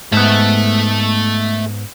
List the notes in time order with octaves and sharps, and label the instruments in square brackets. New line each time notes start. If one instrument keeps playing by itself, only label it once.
[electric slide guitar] G#2 B3 [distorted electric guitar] A3 E5